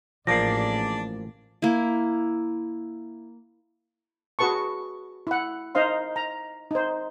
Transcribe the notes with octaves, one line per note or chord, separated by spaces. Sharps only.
A1 F3 A#3 D4 G#4 D5 A#6 C7
A#3 E4
F#4 G#4 B4 A5 C#6
E4 F#5
D#4 C5 D#5 F5 C6
A#5
D#4 C5